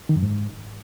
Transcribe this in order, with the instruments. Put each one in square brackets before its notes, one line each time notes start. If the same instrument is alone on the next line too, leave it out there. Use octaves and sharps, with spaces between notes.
[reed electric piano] D#3
F#2
G#2